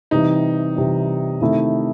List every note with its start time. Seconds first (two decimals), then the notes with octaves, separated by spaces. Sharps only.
0.11 C3 E3 G3 D#4
0.76 C3 E3 G3
1.41 C3 D#3 A3 E4